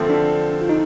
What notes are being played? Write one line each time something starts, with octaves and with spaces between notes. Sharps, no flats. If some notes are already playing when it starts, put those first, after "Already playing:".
Already playing: D3 F3 A3 C4
D4
F4
D#4